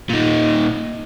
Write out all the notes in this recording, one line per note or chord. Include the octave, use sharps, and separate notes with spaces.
A#2 D#4